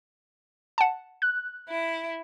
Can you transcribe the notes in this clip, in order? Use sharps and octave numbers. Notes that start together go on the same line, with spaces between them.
F#5 A5
F#6
E4